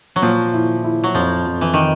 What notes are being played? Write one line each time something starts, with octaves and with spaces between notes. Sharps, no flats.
F#3
A#2 F3
E4
E4
F#3
F2 F3
F2
E3
D#3